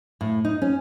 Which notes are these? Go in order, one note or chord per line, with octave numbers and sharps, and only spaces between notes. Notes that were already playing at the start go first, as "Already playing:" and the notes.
A2
D#4
C#4